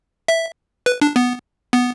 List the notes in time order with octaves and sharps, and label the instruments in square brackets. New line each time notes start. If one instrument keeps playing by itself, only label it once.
[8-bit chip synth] E5
B4
D4
B3
B3